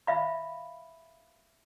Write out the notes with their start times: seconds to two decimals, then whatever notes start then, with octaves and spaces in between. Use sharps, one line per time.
0.07 E5 F5 B5